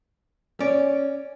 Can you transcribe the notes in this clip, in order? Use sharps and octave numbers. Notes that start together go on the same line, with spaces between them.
C#4 D5